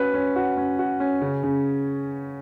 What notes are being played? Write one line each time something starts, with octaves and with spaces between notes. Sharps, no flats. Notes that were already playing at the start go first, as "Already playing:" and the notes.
Already playing: C#4 F#4 B4
C#4
F#4
C#4
F#4
C#4
C#3
C#3